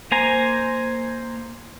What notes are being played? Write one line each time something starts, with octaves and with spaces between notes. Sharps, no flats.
A#3 C5 G#5 A#5